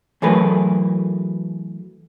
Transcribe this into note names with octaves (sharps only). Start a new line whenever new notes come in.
E3 F#3 A3 G#4 A#4 B4